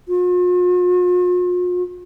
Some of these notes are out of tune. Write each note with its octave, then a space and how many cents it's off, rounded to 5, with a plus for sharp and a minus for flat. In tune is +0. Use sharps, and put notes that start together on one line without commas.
F4 +45